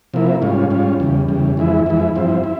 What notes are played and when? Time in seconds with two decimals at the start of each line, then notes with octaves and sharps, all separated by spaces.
0.14 C3 F3 A#3 E4
0.42 G#2 G3 C#4 F4
0.71 G#2 G3 C#4 F4
1.00 E2 C#3 G3
1.28 E2 C#3 G3
1.57 F2 E3 G#3 E4
1.86 F2 E3 G#3 E4
2.16 G2 F3 C4 E4
2.44 E4